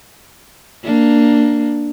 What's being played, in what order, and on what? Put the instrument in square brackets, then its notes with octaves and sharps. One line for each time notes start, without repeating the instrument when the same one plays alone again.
[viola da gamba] A#3 D4